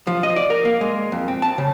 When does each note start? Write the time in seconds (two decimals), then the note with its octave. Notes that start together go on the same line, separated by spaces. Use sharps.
0.07 F3
0.23 D#5
0.36 D5
0.50 A#4
0.65 A#3
0.81 G#3
1.12 F2
1.28 C4
1.42 A5
1.58 C#3